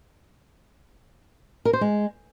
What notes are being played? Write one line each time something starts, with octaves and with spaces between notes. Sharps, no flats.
A#4
C5
G#3